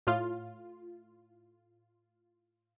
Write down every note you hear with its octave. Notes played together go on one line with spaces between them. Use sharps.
A2 F4